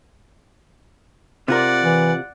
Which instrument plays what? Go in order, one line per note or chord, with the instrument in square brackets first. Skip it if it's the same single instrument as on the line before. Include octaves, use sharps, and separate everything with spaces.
[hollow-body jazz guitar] C3 F4 A#4 [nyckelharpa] D5 F#5
[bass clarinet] E3